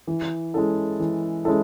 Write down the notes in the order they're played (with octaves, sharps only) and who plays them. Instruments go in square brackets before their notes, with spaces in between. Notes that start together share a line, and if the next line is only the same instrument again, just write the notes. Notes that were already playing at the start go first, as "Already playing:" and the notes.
[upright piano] E3
G#3 C#4 E4 A4
E3
G#3 C#4 E4 A4